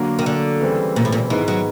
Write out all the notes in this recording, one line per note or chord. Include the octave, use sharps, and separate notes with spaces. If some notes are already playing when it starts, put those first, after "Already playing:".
Already playing: D3 F#3 A#3
D#3
D3
C#3 E3 G3 C4 E4
A#2
A2
A#2
G#2 D#3 E3 G#3 B3
F#3